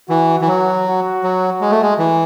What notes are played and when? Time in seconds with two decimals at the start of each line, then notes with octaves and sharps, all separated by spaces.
0.09 E3 F#4
0.41 E3
0.47 F#3
0.86 F#4
1.23 F#3
1.61 G#3
1.71 A3
1.82 G#3
1.98 E3